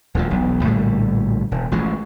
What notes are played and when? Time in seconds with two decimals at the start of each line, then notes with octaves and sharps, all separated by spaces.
0.15 D#1 D2 D3 F3
0.30 E1 B1
0.63 A#1 A2 D3 G3
1.52 E1
1.71 A1 E3 F3 G#3